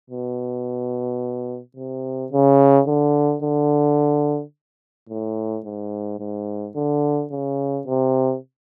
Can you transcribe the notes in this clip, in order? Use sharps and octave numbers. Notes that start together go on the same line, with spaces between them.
B2
C3
C#3
D3
D3
A2
G#2
G#2
D3
C#3
C3